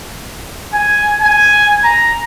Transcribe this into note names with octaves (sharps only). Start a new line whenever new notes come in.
G#5
G#5
A#5